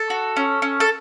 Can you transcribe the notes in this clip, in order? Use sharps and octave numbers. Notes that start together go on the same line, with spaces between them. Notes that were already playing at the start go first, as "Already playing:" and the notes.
Already playing: A4
F#4
C#4
C#4
A4